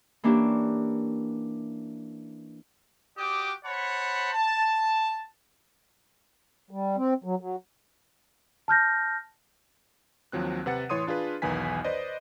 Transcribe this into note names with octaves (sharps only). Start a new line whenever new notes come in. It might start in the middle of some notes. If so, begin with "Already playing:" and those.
E3 A#3 C#4 D4 G4
F#4 G4 D5 G5 D6 D#6
C5 C#5 F#5 A5 B5
A5
G3
C4
F#3
F#3
A5 F6 G6 A#6
D#2 F3 F#3 C4 F#6
C3 B4 F#5 A6 C#7
A2 E3 C#5 C6 D#6 D#7
D4 F4 G#4 B4
B1 E2 D#3 B4 G#5 B6
B4 C5 D5 D#5